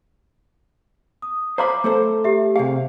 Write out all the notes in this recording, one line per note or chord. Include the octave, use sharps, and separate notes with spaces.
D#6
C5 F5 A#5 B5 D6
A3 A4 C5
G4 E5
C3 G#4 F5